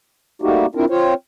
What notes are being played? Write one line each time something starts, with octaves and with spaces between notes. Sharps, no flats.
G3 A3 A#3 D#4 F#4 G4
C4 D4 E4 F4 A#4
C4 F4 C5 C#5